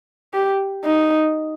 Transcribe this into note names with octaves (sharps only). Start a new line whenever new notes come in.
G4
D#4